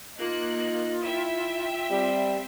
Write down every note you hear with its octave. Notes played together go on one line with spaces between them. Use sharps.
A#3 D#4 F4 F#6
E4 E5 G5
G3 C4